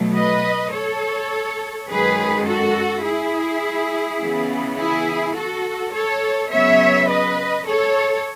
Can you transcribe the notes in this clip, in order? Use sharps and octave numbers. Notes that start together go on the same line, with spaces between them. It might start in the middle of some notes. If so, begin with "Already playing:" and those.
Already playing: B2 F#3 A3
B4 D#5
A4 C#5
F#2 D#3 G#3 G#4 B4
F#4 A4
E4 G#4
C#3 E3 B3
E4 G#4
F#4 A4
A4 C#5
C#3 F#3 B3 C#5 E5
B4 D#5
A4 C#5